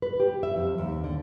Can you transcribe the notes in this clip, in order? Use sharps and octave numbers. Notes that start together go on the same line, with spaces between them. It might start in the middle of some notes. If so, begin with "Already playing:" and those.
B4
G4
E5
F2
D#2
D3